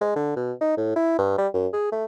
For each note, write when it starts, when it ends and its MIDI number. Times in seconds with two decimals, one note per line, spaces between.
0.01 0.14 56
0.15 0.33 50
0.36 0.52 47
0.61 0.76 63
0.77 0.94 45
0.96 1.14 64
1.18 1.34 43
1.38 1.47 55
1.53 1.67 42
1.73 1.91 68
1.92 2.05 57